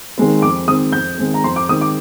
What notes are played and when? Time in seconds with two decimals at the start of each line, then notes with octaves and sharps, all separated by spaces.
0.18 D#3 G#3 C4
0.42 F2 D6
0.68 D#3 G#3 C4 D#6
0.92 F2 G6
1.18 D#3 G#3 C4
1.34 A#5
1.44 F2 C6
1.56 D6
1.69 D#3 G#3 C4 D#6
1.81 D6